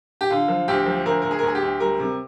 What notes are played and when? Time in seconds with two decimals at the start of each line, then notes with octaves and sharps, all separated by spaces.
0.21 G4
0.30 D3 F4
0.48 F3
0.68 D2 G4
0.86 F3
1.06 D2 A#4
1.22 D2 A#4
1.31 G#4
1.39 A#4
1.43 D2 G#4
1.55 G4
1.62 D2
1.80 G3 A#4
2.00 C3